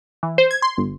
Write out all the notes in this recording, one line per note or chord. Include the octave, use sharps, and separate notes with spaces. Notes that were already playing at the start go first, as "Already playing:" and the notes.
E3
C5
G#6
C6
G1